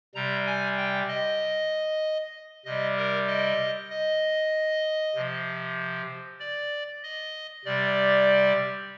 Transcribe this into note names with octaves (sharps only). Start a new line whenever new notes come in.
C3 G3 A#5
G#5
G5
D#5
C3 G3 D#5
A#4
D#5
D#5
C3 F3
D5
D#5
C3 G3 D5